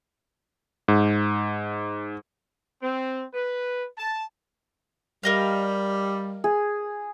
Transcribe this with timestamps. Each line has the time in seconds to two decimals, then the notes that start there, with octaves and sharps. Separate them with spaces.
0.88 G#2
2.82 C4
3.34 B4
3.97 A5
5.23 G3 A#4 D#5 F5
6.44 G#4